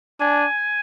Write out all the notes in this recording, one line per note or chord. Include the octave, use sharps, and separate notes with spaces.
D4 G#5